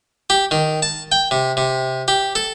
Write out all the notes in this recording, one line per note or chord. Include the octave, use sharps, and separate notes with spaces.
G4
D#3
A5
G5
C3
C3
G4
A4